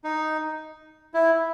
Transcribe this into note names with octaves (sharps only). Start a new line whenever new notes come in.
D#4
E4